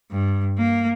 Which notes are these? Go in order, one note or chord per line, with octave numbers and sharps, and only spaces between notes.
G2
A#3